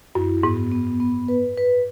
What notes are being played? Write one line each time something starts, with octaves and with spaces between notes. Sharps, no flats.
F#2 E4
G#2 B3
B3
B3
B4
B4